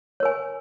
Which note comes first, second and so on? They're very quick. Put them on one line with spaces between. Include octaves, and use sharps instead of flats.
C#5 A#4 G#5